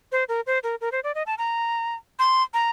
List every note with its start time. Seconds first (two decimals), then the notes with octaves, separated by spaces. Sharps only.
0.12 C5
0.29 A#4
0.47 C5
0.63 A#4
0.81 A#4
0.92 C5
1.04 D5
1.15 D#5
1.26 A5
1.38 A#5
2.19 C6
2.54 A#5